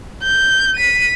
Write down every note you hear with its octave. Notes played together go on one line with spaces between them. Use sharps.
G6
B6 D#7